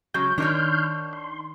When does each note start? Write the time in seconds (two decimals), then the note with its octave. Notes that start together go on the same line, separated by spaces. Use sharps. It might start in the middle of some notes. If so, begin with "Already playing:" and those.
0.14 C#3 F#3 G#3 G6
0.38 D#3 D4 D#4 C#5 C6 F6 G6
1.13 C6